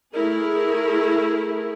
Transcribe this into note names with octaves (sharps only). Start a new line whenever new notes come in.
A3 E4 G#4 A#4